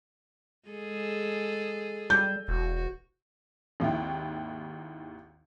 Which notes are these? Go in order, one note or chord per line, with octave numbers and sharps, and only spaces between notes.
G#3 G#4 A4
G3 G6
E1 F#4
G#1 D#2 E4 G5